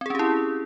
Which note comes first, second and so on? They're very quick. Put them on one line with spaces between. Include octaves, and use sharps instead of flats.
C4 G#4 C#4 G4 E4